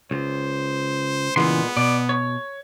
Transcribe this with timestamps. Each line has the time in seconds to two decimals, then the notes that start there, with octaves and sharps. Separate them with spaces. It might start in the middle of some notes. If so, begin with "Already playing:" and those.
0.11 C#2 C5
1.36 A#2 C#3 E3 G#3 B3 C6
1.77 B2 D5
2.09 C#5